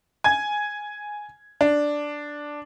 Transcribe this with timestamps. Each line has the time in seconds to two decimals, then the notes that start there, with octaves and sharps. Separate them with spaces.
0.24 G#5 G#6
1.61 D4